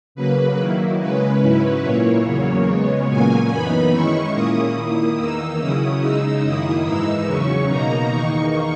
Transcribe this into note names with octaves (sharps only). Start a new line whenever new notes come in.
C#3 F#3 A#3 B4
D#3 F#3 A#3 E4
C#3 G#3 C#4 B4
G#2 F#3 C#4 E4
A#2 A#3 E4 C#5
E2 C#3 F#3 A#3
C#3 G#3 B3
A#2 F#3 A#3 C#4 G#5
F#2 E3 B3 D#4 B5
D#3 G#3 C#4 E4 C#6
A#2 A#3 C#4 E4 D#6
D#3 A#3 E4 D#6
E2 D#3 A#3 D#4 E6
C#3 F#3 C#4 E4 D#6
C#3 G#3 D#4 E6
F#2 D#3 A#3 E4 D#6
G#2 E3 G#3 D#4 E6
E2 C#3 F#3 C#4 C#6
B2 A#3 D#4 A#5
E2 D#3 A#3 D#4 C#6